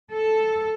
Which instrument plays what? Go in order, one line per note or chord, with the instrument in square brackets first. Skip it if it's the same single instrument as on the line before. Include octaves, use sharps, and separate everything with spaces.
[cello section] A4